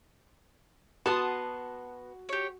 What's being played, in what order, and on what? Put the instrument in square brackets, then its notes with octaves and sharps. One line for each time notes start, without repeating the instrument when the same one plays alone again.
[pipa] B3 [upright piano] F#4 [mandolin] A5 C6 D#6
[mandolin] G4 C#5